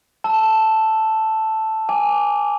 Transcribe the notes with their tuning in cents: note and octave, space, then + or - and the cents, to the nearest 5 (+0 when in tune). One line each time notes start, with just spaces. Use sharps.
A5 +0 E6 +0
G#5 -15 D6 -10